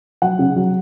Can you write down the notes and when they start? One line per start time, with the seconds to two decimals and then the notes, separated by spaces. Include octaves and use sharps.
0.22 F#3 F#5
0.39 C#3
0.56 F#3